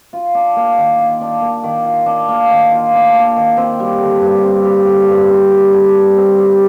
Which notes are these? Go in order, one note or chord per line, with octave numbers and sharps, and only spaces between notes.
F4
D4
A#3
D#3
F4
D4
A#3
D#3
F4
D4
A#3
D#3
F4
D4
A#3
D#3
C4
G3
D3
G2
C4
G3
D3
G2
C4
G3
D3
G2
C4
G3